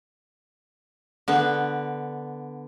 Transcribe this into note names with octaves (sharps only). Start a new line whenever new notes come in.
D3 B3